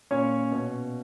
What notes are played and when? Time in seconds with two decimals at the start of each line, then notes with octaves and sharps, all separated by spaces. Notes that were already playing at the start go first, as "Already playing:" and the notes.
0.11 A#2 C#4 C#5
0.51 B2